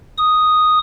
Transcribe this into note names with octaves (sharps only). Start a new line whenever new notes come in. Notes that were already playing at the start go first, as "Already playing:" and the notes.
D#6